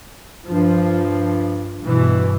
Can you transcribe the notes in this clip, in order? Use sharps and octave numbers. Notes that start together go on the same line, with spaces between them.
G2 F3
G2 B2 E3